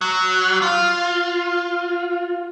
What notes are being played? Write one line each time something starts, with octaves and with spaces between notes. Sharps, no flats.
F#3
F4